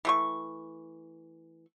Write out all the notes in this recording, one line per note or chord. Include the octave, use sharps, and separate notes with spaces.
E3 A3 C#6